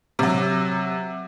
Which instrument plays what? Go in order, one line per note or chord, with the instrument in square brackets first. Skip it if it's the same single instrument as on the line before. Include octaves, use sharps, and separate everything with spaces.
[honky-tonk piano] C3 F#3